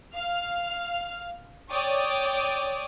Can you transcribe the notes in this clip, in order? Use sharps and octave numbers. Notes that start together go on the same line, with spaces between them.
F5 F6
C#5 D5 G5 D6 D#6